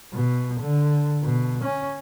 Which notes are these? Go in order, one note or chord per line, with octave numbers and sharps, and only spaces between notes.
B2
D3
B2
C#4